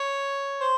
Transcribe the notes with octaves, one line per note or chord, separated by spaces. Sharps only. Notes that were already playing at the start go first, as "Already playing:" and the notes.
Already playing: C#5
C5